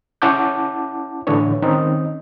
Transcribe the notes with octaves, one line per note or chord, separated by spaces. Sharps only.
C#4 E4 F#5 A5 D6 G6
A2 D3 E3 D4 C#5
D#3 C4 C#4 D#4